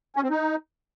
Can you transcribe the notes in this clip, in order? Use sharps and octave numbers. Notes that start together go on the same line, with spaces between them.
C#4
C4
D#4